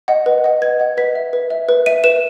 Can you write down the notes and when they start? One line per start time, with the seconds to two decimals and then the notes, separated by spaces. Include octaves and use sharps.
0.08 D#5 F#5
0.26 B4
0.44 D#5 F#5
0.62 B4 G#6
0.80 D#5 F#5
0.97 B4 B6
1.15 E5
1.33 B4
1.50 E5
1.69 B4
1.86 E5 D#7
2.04 B4 E7